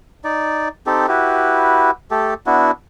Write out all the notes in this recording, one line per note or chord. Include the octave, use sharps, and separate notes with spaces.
D#4 D5
C4 D#4 G4 A4
E4 F#4 G4 B4
A3 G4 A4
B3 D4 E4 F#4